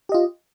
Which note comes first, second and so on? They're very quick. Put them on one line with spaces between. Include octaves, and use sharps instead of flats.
G4 D#5 F4